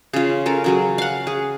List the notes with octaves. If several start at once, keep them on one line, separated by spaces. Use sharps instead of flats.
C#3 F4
C#4 A4 A#4
C#3 F#3 G#4
F5 F#5
G#4